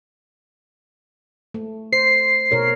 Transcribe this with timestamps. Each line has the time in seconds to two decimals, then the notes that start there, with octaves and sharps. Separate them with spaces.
1.54 A3
1.93 C5 C7
2.51 B2 A#4 C#5